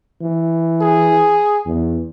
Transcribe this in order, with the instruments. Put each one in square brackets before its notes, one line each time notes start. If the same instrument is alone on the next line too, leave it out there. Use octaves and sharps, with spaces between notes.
[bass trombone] E3
[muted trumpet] G#4
[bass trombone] E2